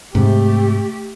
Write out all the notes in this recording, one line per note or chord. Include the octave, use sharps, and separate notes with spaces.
G#2 C3 A3 G4